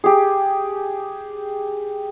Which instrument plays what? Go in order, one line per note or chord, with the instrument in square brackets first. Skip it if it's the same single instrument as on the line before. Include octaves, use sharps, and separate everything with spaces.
[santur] G4 G#4